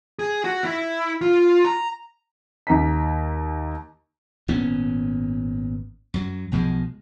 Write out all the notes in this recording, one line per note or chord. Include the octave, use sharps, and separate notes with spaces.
G#4
F#4
E4
F4
A#5
D#2 A#5 B6
G#1 A#2 B3 C#4
F#2 F#3
B1 B2 F3 G#3